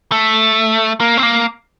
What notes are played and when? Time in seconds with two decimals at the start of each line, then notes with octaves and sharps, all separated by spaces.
0.12 A3
1.00 A#3
1.17 C4
1.23 A#3